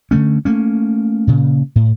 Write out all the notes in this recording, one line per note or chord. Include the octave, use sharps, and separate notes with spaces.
D3 F#3 A3 C#4
A3 A#3 C#4
A#2 C#3
A2